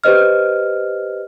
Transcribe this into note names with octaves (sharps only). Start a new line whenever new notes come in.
G4 B4 C5 D#5 F6